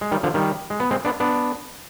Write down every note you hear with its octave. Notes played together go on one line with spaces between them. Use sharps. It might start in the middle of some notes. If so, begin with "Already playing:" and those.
G#3
D#3 G3
D3 F3
D#3 G3
G#3
B3
G#3 C4
B3 D4
B3 D4